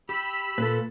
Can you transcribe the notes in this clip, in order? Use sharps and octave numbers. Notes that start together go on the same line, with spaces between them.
G4 B5 E6
A#2 A4 B4